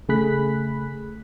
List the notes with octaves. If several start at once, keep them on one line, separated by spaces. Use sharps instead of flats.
C#3 A3 G#4 B5 F#6 B6